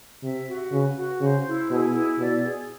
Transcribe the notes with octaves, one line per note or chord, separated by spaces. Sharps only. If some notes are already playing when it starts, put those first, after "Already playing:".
C3 E5
F#4
C#3 B4
F#4
C#3 C5
E4
B2 G#4
E4
B2 D5
G#4